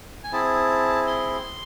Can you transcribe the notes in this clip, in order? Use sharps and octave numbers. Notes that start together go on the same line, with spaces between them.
G#5
C4 E4 G#4 A5
C6